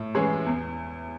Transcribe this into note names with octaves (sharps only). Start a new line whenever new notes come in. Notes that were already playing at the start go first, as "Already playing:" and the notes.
Already playing: A2
E3 G#3 C#4 G#4
E2